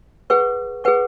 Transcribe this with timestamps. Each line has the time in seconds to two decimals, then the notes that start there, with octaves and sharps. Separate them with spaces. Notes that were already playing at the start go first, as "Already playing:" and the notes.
0.30 G#4 B4 F#5 C#6
0.84 G#4 B4 F#5 C#6